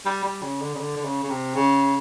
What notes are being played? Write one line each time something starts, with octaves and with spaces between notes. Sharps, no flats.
G3
G3
C#3
D3
C#3
D3
D3
C#3
C#3
C3
C#3